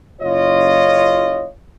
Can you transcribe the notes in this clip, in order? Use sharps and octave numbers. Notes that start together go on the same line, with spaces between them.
F#1 F4 C#5 D#5